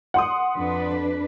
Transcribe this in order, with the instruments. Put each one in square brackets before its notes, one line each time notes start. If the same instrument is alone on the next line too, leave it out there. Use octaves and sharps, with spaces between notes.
[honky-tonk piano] F#5 C6 D#6
[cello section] F2 D4 B4